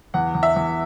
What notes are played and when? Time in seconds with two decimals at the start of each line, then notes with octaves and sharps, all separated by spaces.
0.14 E2 F#5
0.35 E2
0.43 E5
0.56 E2